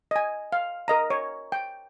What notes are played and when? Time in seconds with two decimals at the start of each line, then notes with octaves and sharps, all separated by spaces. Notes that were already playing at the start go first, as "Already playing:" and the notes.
0.11 D#5 G#5
0.52 F5
0.88 A#4 D#5 A#5
1.10 C#5
1.52 G5